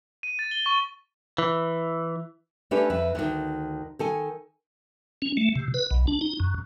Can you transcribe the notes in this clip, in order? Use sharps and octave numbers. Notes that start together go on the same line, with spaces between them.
D#7
A6
G7
C#6
E3
A3 C#4 D4 G4 A4 B4
F2 B4 E5
D2 D#3
D#3 A4 G#5
C#4
A3
C3
B4
B1
D4
D#4
F#2